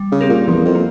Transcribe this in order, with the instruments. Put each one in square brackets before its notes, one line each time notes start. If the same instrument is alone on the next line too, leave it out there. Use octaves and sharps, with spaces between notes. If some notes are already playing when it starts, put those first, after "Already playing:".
Already playing: [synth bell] G3
[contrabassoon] C#3
[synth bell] C4 G4 A#4
[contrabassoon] A#2
[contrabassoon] E2 [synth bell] F3
[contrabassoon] F2
[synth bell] A#3